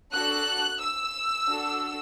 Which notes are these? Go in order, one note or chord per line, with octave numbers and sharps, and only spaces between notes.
D4 F#4 A4 F#6
E6
D4 F#4 A4